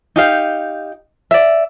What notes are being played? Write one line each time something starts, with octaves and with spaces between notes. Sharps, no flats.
D#4 G4 F5
D5 E5